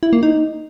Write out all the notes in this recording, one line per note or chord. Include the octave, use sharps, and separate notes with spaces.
E4
A#3
D#4